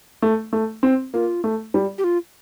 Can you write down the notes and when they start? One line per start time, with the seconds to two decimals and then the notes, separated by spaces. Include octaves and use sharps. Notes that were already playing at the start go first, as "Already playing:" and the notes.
0.22 A3
0.53 A3
0.83 C4
1.13 A#3 F4
1.44 A3
1.74 G3
1.98 G4
2.04 F4